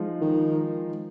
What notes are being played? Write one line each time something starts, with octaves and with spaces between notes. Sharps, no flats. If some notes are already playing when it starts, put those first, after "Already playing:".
Already playing: F3 G#3 D#4
D#3